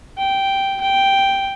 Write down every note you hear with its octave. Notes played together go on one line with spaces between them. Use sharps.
G5
G5